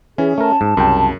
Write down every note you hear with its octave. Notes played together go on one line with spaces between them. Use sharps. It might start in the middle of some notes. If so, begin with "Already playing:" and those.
E3 C#4 G#4
A3 A#4 A5
G#2
C2 F#2 C#3 G5